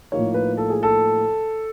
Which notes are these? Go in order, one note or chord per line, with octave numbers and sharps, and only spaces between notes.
A2 F3 A#3 D#4 C#5
B4
A4
G#4
A4